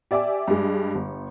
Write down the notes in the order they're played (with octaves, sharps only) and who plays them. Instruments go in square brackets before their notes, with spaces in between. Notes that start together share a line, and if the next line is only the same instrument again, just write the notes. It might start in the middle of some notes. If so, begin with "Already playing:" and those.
[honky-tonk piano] G4 D5 E5 G#5 D6
G2 G3 G#3
G1